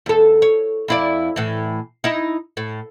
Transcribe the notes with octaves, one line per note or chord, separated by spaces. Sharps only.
E2 A4
C#5
F2 E4 D5
A2 E3
D#4 E4
A2